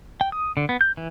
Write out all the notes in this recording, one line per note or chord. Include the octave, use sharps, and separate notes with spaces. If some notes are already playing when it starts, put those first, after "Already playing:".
G5
D#6
D3
B3
G6
E3